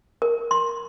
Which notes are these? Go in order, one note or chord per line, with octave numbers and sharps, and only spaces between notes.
A#4
C6